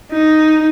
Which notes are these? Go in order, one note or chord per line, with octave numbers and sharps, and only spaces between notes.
D#4